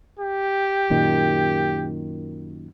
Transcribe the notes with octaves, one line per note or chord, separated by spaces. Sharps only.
G4
F#2 A#2 D#3